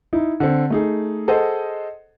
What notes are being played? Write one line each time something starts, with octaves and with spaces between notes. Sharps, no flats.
D#4 E4
D3 C4
A3 D#4 G#4
G#4 A4 C5 D#5 F#5